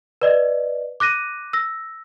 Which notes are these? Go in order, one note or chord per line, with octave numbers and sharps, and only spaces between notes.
B4 D5 D#5
D6 F#6 A#6 D#7
E6 A#6